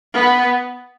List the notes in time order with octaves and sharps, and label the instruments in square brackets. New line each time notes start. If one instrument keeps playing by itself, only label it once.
[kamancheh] B3